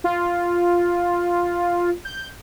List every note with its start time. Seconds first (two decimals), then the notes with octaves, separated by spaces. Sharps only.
0.04 F4
2.05 G6